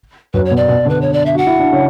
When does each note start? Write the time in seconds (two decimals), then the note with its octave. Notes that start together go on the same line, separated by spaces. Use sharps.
0.33 F#2 F#3 B4
0.45 C#5
0.51 B2 B3
0.56 D5
0.68 B2 B3
0.85 D3 D4 B4
1.01 C#5
1.13 D5
1.26 E5
1.35 F#4 F#5
1.47 E4
1.59 D4
1.72 C#3 C#4